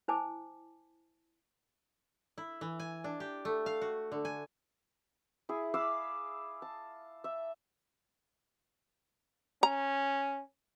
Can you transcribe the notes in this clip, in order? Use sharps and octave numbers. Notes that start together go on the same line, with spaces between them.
E4 C5 G#5 A5 D6
E4
E3
G#5
D4
G4
A3
F5
F#4
D3
G#5
E4 G#4
F5 B5 D6 E6
A5
E5
C#4 A#5